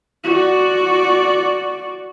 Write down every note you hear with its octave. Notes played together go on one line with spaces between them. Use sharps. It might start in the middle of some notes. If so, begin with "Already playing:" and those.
F#4 D5